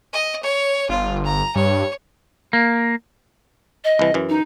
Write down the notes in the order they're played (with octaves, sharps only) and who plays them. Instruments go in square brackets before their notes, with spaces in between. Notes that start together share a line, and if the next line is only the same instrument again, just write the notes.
[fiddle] D#5
C#5
[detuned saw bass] G1 [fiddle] F4
[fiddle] A#5
[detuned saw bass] G2 [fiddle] C#5
[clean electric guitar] A#3
[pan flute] D#5
[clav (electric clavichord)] C2 E3
F#2 E3
[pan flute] D#4